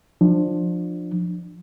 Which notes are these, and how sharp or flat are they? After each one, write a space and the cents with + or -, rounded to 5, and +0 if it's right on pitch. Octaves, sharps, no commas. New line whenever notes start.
F3 +15 D4 +25